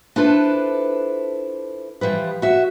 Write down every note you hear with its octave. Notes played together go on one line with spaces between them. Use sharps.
D4 E4 F4 A4 B4 C5
E3 F3 G3 B4
F#4 E5